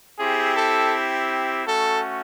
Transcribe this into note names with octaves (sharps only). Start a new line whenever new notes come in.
C4 E4 G4 G#4
A4
A3 C#4 F#4 A4